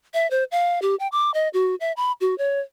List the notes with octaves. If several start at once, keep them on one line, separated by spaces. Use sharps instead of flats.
E5
C5
F5
G4
G5
D6
D#5
F#4
E5
B5
F#4
C#5